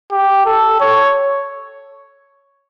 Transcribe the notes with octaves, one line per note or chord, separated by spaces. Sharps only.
G4
A4
C#5